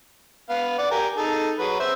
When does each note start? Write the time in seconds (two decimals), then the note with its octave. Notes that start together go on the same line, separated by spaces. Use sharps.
0.50 B3 F5
0.78 D5 F#5
0.91 G4 A#4 G#5
1.17 D#4 G#4 A4
1.58 F#3 G#4 B4
1.80 C5 E5 E6